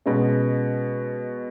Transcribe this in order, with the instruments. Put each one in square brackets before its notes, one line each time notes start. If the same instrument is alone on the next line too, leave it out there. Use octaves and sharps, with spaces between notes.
[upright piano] B2 G#3 C#4